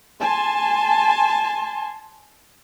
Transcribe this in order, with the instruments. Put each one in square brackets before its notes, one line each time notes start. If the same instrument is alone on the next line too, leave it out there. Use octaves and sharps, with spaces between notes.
[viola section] G#5 A5 C6